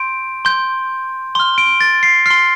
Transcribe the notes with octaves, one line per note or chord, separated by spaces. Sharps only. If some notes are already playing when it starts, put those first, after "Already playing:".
Already playing: C6 G6 D7
C6 G6
C6 F6 G7
D7
A6
C7
C6 F6 C7